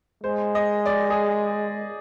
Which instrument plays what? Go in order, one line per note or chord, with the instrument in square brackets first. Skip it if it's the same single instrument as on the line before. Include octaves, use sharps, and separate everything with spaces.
[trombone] G#3 [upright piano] C5
[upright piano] D#5
D5
G#4